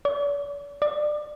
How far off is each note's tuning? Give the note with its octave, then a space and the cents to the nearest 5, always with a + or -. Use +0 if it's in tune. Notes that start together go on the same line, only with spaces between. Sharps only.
D5 -45
D5 +25